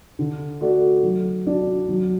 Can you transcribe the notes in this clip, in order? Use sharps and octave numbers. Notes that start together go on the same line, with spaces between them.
D3
A3 F#4 A4 D5
F#3
D4 F#4 D5
F#3